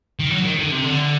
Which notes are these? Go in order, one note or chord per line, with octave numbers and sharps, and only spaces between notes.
D#3
F#3
D#3
D3
C3
D3